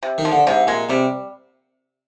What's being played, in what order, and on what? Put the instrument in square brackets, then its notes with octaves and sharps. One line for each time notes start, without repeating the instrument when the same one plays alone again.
[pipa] C3
[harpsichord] D#3
[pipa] F3
[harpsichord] D3
[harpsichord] G#2 [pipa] C3
[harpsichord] A#2 [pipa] G#3
[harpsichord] C3 [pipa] G3